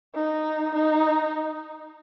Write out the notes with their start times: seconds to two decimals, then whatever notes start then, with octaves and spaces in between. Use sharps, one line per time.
0.15 D#4
0.74 D#4